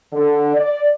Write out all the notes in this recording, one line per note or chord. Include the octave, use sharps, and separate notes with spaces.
D3
D5